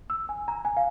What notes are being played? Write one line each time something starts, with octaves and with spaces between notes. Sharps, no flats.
E6
G#5
A#5
G#5
F5